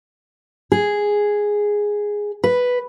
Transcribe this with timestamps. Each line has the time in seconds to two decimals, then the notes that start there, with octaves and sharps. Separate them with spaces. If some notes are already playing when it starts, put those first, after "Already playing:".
0.72 G#4
2.44 B4